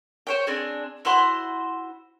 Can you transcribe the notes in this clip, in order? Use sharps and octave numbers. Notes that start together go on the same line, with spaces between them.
C5 C#5 G5
C4 D4 G#4
E4 F#4 C5 C6